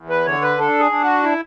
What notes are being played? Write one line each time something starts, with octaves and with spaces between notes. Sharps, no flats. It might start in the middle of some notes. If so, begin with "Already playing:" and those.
Already playing: E2
B4
D3 C#5
B4
D4 A4
G#4
D4
F#4
E4